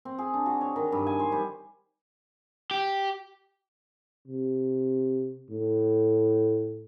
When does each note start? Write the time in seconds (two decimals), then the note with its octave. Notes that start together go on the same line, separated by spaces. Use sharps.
0.05 C4
0.19 G#4
0.34 D4
0.46 F#4
0.61 C#5
0.76 D#3
0.92 G2
1.07 G#5
1.20 C5
1.32 G3
2.71 G4
4.28 C3
5.51 A2